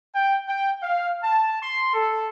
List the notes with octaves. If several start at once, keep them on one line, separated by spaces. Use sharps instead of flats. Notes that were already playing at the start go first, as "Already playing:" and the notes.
G5
G5
F5
A5
C6
A4